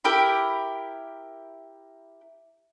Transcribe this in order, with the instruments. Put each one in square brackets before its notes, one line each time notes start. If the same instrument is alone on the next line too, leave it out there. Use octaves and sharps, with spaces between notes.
[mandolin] E4 G4 A#4 B5